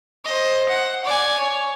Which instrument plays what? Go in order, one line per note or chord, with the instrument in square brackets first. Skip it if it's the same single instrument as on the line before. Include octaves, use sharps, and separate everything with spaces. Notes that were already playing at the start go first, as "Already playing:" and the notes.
[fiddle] C5 D#5
F#5
D5 G#5
C#5